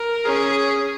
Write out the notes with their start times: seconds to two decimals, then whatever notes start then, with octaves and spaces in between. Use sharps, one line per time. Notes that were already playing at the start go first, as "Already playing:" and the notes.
Already playing: A#4
0.26 C#4 G#4